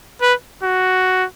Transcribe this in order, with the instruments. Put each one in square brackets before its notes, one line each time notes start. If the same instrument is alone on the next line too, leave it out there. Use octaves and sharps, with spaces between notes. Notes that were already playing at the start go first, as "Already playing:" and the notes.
[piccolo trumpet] B4
F#4